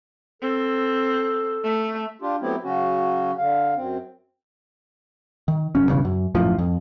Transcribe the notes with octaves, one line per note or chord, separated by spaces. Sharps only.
C4 A4
A3
D4 F4 G4
F#3 A3 B3 C4 E4 G4
C#3 F#3 C#4 F#4
D3 F5
F#2 C4
D#3
F1 F#2 C#4
E1 E2 G2 C#3
F#2
A#1 F#2 A2 F3
F2